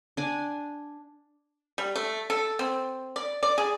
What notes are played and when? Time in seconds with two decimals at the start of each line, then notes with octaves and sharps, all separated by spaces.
0.17 D4 G#5
1.78 G3
1.96 A3
2.30 A4
2.59 C4
3.16 D5
3.43 D5
3.58 G#4